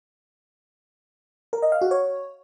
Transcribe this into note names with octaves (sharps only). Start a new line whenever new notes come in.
A#4
D#5
F5
F#4
C#5